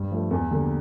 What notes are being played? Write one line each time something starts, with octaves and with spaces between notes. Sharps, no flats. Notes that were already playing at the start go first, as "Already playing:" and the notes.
Already playing: G2
F3 A3
E2
D3 G3 A#3